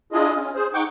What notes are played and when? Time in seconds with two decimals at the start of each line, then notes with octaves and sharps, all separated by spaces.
0.13 D4 E4 F4 G#4 D#5
0.34 C#4
0.55 G#4 C5
0.74 D#4 F#5 G5 C#6 D6 G6